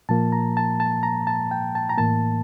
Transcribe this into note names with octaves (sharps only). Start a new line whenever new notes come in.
A#2 F3 A#3 A5
A#5
A5
A5
A#5
A5
G5
A5
A#5
A2 E3 A#3 A5